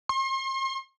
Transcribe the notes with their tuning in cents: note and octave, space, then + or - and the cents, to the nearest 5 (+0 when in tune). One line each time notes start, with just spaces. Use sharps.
C6 +40